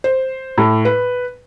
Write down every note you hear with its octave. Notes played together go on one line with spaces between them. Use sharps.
C5
A2
B4